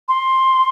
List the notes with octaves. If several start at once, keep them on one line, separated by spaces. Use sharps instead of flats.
C6